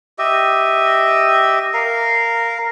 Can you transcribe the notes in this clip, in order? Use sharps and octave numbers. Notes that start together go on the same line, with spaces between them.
G4 D#5 E5
A#4 F5